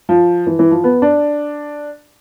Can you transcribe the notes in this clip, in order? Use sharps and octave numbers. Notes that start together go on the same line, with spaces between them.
F3
E3
E3
F3
B3
D4